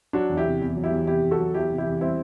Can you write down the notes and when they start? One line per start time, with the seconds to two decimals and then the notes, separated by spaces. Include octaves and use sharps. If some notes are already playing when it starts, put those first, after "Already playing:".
0.13 F#3 D4 F#4
0.29 E2
0.37 E4 G4
0.46 C3
0.61 E2
0.76 F#3
0.84 E4 G4
0.92 E2
1.07 C3 E4 G4
1.24 E2
1.31 F#4 A4
1.39 F#3
1.54 E2 E4 G4
1.70 C3
1.78 E4 G4
1.86 E2
2.01 G3 C4 E4